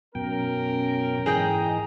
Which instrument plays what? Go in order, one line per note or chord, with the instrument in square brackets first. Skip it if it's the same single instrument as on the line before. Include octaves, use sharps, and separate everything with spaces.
[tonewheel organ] F#2 B2 G5 [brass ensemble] C#4 A#4
[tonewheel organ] G#2 E3 A#5 [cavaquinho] G#4 D#5 G5